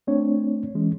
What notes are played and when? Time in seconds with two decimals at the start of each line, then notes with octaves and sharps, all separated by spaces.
0.07 A3 C4 D4 C#5
0.75 E3 G#3 C#4